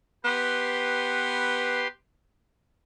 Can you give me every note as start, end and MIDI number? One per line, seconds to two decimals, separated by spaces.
0.24 1.84 59
0.24 1.88 67
0.24 1.88 71
0.24 1.88 84